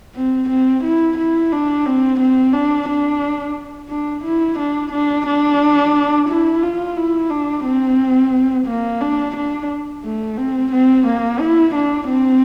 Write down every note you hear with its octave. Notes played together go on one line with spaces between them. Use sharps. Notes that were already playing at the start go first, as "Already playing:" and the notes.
C4
C4
E4
E4
D4
C4
C4
D4
D4
D4
E4
D4
D4
D4
E4
F4
E4
D4
C4
A#3
D4
D4
A3
C4
C4
A#3
E4
D4
C4